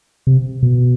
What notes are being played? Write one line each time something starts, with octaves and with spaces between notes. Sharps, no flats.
C3
B2